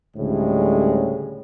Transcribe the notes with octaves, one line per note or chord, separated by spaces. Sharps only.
D2 A2 C#3 G3 G#3